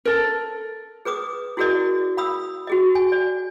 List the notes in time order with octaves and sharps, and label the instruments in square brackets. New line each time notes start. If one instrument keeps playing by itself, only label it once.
[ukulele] A4 A#4
[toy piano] G#4 B4 D6 D#6
E4 F#4 G#4 A#4 D5 D#5
F5 B5 D#6 E6
F#4 G#4 D#5
G#5
D5